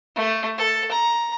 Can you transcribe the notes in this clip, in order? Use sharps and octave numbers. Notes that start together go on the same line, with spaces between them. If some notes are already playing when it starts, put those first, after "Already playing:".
A3
A4
A#5